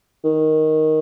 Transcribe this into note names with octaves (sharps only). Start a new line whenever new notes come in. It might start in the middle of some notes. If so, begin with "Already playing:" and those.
D#3